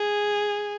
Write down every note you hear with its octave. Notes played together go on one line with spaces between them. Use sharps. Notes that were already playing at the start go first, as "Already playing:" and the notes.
Already playing: G#4